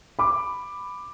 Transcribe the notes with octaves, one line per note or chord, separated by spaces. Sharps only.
B5 D6